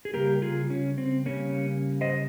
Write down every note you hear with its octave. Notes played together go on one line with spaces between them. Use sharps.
G#4
C#3 G3 A#3 G4 A#4
F4 G#4
C#4
C4
C#3 G3 A#3 C#4
C5 D#5